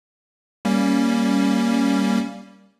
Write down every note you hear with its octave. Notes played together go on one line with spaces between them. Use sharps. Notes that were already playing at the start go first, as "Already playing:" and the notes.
G3 A#3 C#4